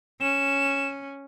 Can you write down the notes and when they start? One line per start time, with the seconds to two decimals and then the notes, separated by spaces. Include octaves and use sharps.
0.21 C#4 E7